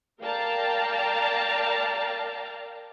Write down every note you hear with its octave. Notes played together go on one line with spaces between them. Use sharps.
A#4 D5 F5 G5 A5 A#5